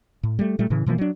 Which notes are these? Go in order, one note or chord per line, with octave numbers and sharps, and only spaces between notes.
A2
G3 A3
A#2 G3 A3
A2 C#3 E3
B2 E3 F3 A#3
F#3 D4